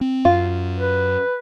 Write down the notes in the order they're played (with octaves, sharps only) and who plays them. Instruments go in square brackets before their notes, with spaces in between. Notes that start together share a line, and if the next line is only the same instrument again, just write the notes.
[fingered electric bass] C4
[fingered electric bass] F#2 [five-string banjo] F4
[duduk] B4